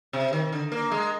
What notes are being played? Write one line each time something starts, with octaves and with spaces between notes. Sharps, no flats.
C3
D#3
D3
A#3
G#3